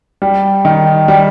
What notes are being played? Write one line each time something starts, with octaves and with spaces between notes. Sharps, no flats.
G3
D#3
G3